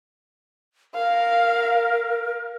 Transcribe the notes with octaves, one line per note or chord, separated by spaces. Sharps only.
A#4 F5